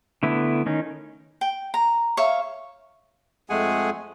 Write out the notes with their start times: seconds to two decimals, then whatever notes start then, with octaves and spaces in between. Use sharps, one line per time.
0.23 D3 A3 B3 E4
0.66 D#3 C#4 D#4
1.41 G5
1.74 A#5
2.17 C#5 E5 F5
3.50 F2 G#3 A3 G#4 F#5 G#5